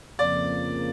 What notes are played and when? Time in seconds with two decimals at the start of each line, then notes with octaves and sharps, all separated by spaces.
0.19 F2 C#3 F3 A#3 D5